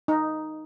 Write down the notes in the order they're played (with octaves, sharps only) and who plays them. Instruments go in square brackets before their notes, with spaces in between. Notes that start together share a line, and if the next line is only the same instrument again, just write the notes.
[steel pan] D#4